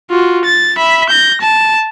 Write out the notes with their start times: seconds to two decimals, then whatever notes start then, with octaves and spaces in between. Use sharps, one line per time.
0.10 F4 F#4
0.45 A6
0.77 E5 B5
1.10 G6 A#6
1.41 A5